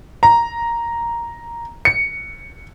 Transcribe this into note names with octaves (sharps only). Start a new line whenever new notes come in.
A#5
C#7